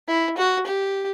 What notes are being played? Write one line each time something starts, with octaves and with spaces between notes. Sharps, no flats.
E4
F#4
G4